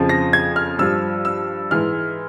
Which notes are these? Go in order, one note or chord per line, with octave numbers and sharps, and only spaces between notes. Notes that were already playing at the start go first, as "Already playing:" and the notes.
Already playing: F2 C#3 F3
A#6
G#6
F6
G2 F3 E6
E6
G#2 E3 F6